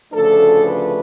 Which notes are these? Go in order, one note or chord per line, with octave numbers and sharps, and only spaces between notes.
D2 C#3 F3 A3 D4 A4
B4